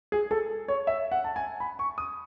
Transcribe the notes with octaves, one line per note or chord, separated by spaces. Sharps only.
G#4
A4
C#5
E5
F#5
A5
G#5
B5
C#6
D#6